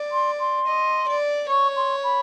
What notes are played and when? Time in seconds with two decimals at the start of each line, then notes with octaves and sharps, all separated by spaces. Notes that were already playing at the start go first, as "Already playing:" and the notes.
Already playing: D5
0.12 C6
0.40 C6
0.67 D#5
1.08 D5
1.49 C#5 C#6
1.76 C6
2.03 B5